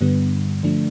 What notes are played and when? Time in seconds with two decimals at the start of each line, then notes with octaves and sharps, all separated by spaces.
0.01 G2 D3 G3 B3
0.63 D3 F3 A3 D4